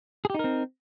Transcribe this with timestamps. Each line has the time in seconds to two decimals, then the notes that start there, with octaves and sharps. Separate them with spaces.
0.25 G#4
0.30 G4
0.35 D#4
0.39 A#4
0.44 C4